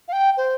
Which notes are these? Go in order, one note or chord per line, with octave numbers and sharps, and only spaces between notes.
F5
G5
C5